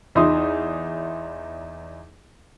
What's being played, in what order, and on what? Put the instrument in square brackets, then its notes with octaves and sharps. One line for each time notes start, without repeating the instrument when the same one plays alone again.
[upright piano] E2 D#4 E4 E5 C6 D#6